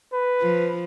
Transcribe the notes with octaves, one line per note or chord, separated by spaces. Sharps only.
B4
F3